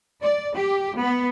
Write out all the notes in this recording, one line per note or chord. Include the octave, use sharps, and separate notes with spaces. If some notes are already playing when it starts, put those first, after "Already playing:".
D5
G4
B3